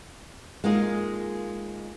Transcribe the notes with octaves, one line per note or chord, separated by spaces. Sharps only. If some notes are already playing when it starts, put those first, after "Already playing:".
G#3 A#3 D#4 F4 G#4